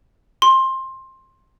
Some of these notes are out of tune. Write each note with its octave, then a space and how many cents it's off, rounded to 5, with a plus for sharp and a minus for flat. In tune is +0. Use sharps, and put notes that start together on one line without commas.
C6 +15